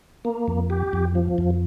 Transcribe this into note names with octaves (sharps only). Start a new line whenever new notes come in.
A#3
F2
G4
F2
F3
F2